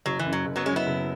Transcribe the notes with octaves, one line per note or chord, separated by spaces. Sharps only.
F#1 F#3
E3
F#2
F#3
F#1
F#3 B3
F#3 G#3 C#4
B3 E4
F#1